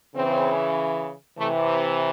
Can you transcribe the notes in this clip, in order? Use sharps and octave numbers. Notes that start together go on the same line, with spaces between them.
C#3 E3 C4
C3 E3 A3